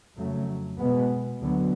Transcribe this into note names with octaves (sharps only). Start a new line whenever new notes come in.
F2 C#3 F#3 A3
B2 G#3 B3
D2 D3 F#3 B3